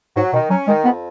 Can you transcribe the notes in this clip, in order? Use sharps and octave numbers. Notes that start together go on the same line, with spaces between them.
G#2 F#3
B2 D#3
F#3 C#4
D#3 G#3
F2 B3